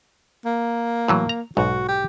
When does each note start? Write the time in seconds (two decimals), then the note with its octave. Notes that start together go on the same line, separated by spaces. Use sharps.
0.45 A#3
1.08 A2 E3 F#3
1.29 A#5
1.57 B1 G#2 F#4
1.88 G4